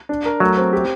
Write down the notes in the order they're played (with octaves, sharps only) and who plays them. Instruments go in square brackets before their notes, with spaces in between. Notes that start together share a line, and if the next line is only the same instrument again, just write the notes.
[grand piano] D4
A#4
[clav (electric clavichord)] F#3 [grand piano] A3
[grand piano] C4
G4